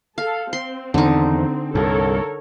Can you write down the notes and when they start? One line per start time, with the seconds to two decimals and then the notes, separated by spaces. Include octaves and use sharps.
0.18 A4 F5
0.53 C4 C6
0.94 E2 D3 D#3 D#4
1.75 C2 G2 A4 A#4 C#5